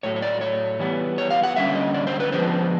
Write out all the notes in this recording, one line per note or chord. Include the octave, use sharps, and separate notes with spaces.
A2 F#3 A3 C#5
C#5
D5
C#5
E3 G3 B3
C#5
F5
F#5
D3 G3 A#3 C#4 E5
D#5
D5
C5
B4
F3 G#3 B3 D4 C5